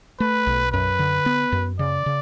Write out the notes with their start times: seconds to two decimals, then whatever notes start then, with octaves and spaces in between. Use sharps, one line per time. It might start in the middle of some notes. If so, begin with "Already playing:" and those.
0.20 A3 B4
0.47 B1
0.72 F#2 B4
0.99 D3
1.26 B3
1.52 F#2
1.79 C#3 D5
2.06 C#3